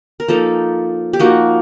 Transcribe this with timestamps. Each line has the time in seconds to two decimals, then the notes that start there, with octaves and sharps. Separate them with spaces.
0.20 A#4
0.28 F3 A#3 D#4 A4
1.13 G4
1.20 F3 A#3 D#4 F#4